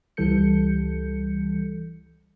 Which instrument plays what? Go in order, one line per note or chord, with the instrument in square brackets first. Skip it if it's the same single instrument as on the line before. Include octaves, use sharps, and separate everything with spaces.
[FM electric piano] C#2 E3 G3 A4 G6 C#7